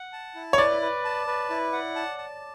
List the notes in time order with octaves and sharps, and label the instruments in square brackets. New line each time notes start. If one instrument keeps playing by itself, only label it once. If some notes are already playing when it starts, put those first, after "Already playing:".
Already playing: [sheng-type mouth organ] F#5
A5
E4
[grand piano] C#5
[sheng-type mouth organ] B4 [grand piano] D5
[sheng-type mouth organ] B4
A5
B4
E4
F#5
A5
A5